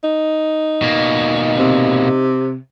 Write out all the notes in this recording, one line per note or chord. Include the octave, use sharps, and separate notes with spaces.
D#4
B2 A#3
C3